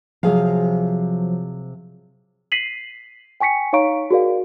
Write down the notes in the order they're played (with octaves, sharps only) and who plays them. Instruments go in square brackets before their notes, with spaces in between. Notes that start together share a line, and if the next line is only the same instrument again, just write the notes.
[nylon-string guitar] C3 G#4 F5 [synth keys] F3 F#3
[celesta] B6 C7 D#7 F#7
G5 G#5 C#6 B6 C#7
D#4 C#5 F5 A#5 C#6 D7
F#4 G#4 A#4 D5 F5